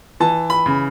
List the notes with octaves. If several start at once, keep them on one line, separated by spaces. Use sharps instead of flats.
E3 A5
B5
C#3